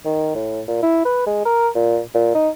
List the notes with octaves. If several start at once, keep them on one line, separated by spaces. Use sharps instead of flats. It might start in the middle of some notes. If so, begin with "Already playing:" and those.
D#3
A2
A#2
E4
B4
G#3
A#4
A#2
A#2
D#4